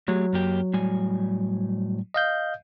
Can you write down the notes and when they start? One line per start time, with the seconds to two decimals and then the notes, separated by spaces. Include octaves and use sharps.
0.08 F#3 A3 G4 G#4
0.33 F#2 A#3 G4
0.73 A2 G3 G#5
2.14 D#5 F5 G6